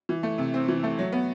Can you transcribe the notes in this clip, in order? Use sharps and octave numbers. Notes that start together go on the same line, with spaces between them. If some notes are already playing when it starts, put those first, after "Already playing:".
E3
A3
C3
C4
E3
A3
F#3
B3